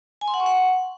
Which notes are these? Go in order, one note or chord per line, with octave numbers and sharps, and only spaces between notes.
G#5
C6
F#5
C#6
F#5